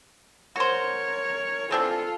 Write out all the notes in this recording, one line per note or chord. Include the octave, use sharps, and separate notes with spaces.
F#4 A#4 C5 C#5
E3 C4 D4 F4 A4